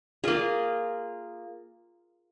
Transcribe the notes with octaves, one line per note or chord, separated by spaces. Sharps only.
A#3 F4 G#4